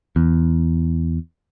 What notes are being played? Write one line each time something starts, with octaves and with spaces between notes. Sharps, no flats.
E2